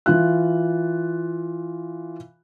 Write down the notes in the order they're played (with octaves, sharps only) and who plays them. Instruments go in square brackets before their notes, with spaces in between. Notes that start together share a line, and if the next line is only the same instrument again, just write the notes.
[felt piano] E3 F4 F#6